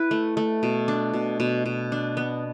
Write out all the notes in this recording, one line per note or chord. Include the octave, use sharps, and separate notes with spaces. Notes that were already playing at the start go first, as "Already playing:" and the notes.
Already playing: E4 B4
A3
A3
B2
D4
B2
B2
B2
D4
B3